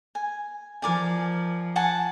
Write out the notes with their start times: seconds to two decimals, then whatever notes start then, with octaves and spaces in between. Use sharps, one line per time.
0.15 G#5
0.82 F3 A#4 D5 G#5
1.76 F#5 G#5 A5